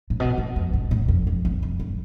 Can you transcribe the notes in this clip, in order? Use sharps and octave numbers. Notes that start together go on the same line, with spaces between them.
A2
B2
A2
F2
G2
A2
F2
F2
E2
F2
G2